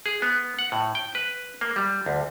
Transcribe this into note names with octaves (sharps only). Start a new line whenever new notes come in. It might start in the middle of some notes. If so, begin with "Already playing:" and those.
G#4
B3
F#5
A2
G5
B4
A#3
G3
D2